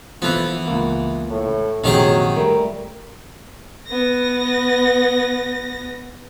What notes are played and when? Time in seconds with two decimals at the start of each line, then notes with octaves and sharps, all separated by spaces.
0.22 E3 F3 B3 A4 B4
0.67 C#2 A#3
1.30 A2
1.84 A#1 F#2 C3 D#3 F#3 G4 G#4
2.36 G3 A3 A#4
3.87 B3 A#6